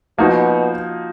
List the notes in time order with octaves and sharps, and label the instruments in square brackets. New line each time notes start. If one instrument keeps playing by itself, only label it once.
[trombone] B2 [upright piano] F3 A#3 D#4 F#4